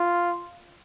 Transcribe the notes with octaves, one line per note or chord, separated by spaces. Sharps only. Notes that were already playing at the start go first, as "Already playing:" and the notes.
Already playing: F4